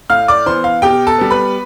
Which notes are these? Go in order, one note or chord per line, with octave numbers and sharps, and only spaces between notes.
A2 F5 F6
D5 D6
E3 B3 C5 C6
F5
B2 G4 G5
A4 A5
G3 B3
B4 B5